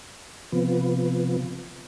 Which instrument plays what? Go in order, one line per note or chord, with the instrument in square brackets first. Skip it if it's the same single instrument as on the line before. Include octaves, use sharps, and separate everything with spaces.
[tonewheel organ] C3 F3 B3